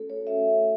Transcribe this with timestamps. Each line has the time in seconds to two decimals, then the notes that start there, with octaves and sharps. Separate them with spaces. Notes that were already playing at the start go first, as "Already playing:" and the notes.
Already playing: A3 C#4 F#4 A4
0.10 C#5
0.27 A3 C#4 F#4 E5